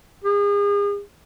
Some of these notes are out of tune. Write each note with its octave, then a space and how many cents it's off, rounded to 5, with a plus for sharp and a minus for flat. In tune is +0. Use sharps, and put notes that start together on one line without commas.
G#4 -40